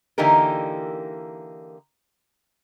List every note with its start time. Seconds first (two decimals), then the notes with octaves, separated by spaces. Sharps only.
0.18 D3 E3 A#3 D#4 G4 A#4